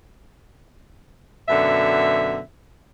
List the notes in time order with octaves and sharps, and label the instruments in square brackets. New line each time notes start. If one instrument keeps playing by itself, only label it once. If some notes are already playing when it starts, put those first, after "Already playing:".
[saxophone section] F#2 B2 D3 E5